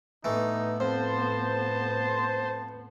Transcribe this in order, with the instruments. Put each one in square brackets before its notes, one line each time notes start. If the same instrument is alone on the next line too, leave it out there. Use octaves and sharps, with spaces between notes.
[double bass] A2 B3 [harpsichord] E3 A3 [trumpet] D#4
[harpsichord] F2 [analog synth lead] C5 [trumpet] A5